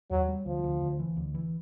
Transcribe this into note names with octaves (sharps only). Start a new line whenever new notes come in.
D#2 F#3
G3
D2 F3
D2
D2
E3
D2
E3